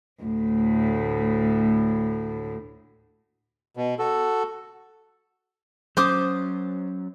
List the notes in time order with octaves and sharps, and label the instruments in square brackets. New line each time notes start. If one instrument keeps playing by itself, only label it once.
[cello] D2 A2
[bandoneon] B2
F#4 A4
[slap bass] F#3 C#4 [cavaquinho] C5 D6 D#6